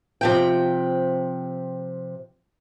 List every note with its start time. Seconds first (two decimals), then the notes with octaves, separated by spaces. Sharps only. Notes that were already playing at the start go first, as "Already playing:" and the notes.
0.21 C3 F3 G5